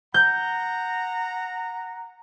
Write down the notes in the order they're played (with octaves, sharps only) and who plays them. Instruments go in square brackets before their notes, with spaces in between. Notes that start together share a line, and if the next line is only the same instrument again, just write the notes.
[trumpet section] F#5 A#5 [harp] G6